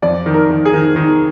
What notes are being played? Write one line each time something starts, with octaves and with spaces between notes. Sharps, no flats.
F2 D5
D#3
A#4
D#3
G#4
D#3
D#3